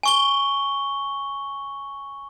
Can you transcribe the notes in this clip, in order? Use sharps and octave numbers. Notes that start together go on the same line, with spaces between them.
G#5 C#6 G7